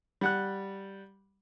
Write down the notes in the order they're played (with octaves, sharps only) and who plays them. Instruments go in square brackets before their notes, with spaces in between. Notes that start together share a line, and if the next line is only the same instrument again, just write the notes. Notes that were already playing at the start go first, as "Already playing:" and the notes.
[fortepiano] G3 F#5 F#6